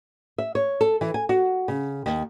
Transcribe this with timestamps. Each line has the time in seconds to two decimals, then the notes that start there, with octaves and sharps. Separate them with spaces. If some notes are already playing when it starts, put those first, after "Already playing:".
0.38 E5
0.55 C#5
0.81 A4
1.01 E3
1.14 G#5
1.29 F#4
1.68 C#3
2.06 D#2